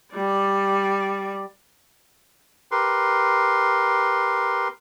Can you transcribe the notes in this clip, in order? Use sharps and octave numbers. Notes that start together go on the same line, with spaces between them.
G3 D5
G4 A#4 B4 C6